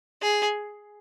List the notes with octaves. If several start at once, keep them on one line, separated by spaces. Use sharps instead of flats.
G#4